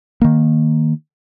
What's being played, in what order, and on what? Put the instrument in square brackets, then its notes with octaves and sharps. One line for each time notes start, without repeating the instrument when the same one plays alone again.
[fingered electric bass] D#3 A#3